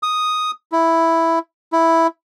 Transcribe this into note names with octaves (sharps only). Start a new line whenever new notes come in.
D#6
E4
E4